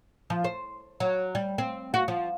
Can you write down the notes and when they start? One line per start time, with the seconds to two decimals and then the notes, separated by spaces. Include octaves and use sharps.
0.30 F3
0.44 C5
1.00 F#3
1.35 G3
1.58 C4
1.94 F#4
2.08 F3